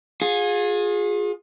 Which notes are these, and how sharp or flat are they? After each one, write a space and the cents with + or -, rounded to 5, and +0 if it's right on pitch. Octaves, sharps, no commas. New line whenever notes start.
F4 +40 G#4 +0